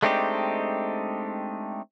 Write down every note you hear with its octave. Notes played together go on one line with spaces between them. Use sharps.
G#3 A3 C4 D4 D#4 G4